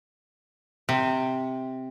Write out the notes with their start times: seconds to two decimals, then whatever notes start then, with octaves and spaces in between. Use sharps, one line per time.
0.89 C3